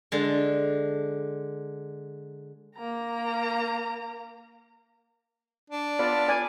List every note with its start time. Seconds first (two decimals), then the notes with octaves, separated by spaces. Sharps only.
0.12 D3 G#3
2.76 A#3 A#5
5.70 D4
5.99 B3 F4 A4 D5
6.28 D5 G#5